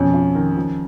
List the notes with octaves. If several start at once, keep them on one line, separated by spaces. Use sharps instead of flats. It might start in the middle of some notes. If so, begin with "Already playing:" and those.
Already playing: F2 B2 C#4
F4
D#3
F3